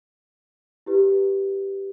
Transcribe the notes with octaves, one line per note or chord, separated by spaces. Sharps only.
E4 G4 B4